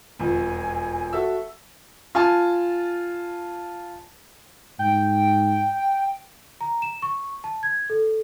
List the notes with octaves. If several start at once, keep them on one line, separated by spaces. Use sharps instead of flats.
E1 F2 G#5
F#4 A4 E5 E6
F4 G#5 A5
G#2 G5
A#5
E7
C#6
A5
G#6
A4